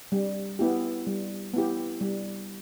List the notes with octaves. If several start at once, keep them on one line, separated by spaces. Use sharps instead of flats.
G3
B3 E4 G4
G3
B3 E4 G4
G3